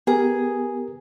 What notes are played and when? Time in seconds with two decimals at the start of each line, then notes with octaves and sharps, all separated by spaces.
0.07 B3 G4 G#4 A#4